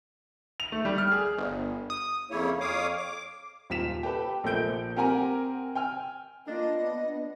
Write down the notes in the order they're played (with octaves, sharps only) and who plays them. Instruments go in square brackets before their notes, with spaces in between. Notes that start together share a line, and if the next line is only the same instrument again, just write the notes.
[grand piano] F7
A3
G3
F6
G#4
[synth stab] G1
D#6
[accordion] F2 C#3 A#3 E4 C#5
F2 C#5 F5 D6 D#6
D6
[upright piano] D#1 F4 B6 E7
G4 A4 B4 G5
A#1 A3 A#3 G6 D7 G7
C4 G4 A#4 F#5 G#5 A#5
G5 G#5 F6
[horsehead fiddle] A#3 F4 [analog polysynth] D4 [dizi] D#5
[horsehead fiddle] B3